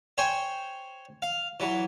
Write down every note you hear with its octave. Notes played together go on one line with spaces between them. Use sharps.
C5 C#5 G5 G#5
F5
E3 F#3